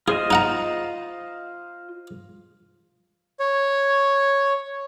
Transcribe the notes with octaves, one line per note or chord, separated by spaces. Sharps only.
F4 G#4 C5 D#5
D#4 F#5 A#5
C#5